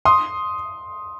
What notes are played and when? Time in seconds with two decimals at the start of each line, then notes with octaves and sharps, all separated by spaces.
0.05 C6 D#6